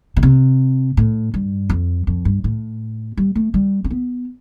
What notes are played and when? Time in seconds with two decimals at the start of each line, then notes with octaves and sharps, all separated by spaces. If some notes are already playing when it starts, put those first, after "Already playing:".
0.17 B2
0.23 C3
0.97 A2
1.34 G2
1.70 F2
2.07 F2
2.25 G2
2.44 A2
3.17 G3
3.35 A3
3.54 G3
3.84 C4
3.90 B3